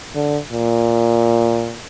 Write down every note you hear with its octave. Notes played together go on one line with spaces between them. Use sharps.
D3
A#2